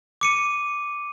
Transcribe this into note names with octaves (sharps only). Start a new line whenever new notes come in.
D6 C#7 D#7